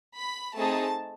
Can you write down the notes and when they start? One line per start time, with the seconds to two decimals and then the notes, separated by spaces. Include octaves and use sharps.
0.15 B5
0.55 A3 C4 D#4 G#4 A5